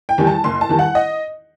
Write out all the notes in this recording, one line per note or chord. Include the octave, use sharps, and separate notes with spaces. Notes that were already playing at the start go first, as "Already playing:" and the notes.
G5
E2 D#3 G3
A5
F#1 C6
A5
E2 D#3 G3
F#5
D#5